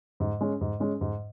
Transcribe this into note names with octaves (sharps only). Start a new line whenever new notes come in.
G#2
G#3 C#4
G#2
G#3 C#4
G#2